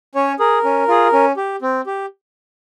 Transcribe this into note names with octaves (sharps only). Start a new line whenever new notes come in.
C#4 C#5
G#4 A#4
C#4
F4 G#4
C#4
G4
C4
G4